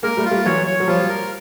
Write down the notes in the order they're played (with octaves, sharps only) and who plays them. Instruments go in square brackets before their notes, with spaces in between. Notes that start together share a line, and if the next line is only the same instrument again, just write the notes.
[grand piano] G#3 A#3 [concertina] A#4
[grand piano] G3 A3
[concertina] F4
[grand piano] G3 A3
[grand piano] E3 F#3 [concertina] C#5
[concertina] C#5
[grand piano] F#3
[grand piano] F3 G3 [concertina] F4
[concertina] A#4